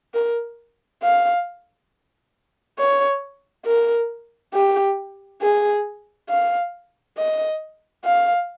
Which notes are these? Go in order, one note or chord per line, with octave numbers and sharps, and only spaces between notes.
A#4
F5
C#5
A#4
G4
G#4
F5
D#5
F5